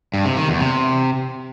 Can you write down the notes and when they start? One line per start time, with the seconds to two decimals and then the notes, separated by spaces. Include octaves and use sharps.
0.14 G2
0.25 C3
0.37 D#3
0.49 E2
0.60 C3